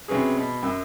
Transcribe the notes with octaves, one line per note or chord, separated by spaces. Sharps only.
C3 F#3 B3 C#4 G#4
B2
F#2 E6